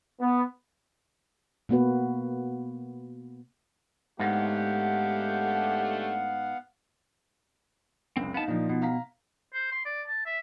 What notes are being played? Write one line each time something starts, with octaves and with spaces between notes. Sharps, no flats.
B3
B2 A#3 B3 F#4 B4
G#2 D3 G#3 A3 B3 G4 F5 F#5
F#1 C#2 C4
B3 D#4 F5 A5
A#2 F3 D#4
B2
F5 A#5 B6
C5
C6
D5
A5
E5